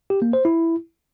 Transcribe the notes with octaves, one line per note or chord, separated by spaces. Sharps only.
G4
A#3
C5
E4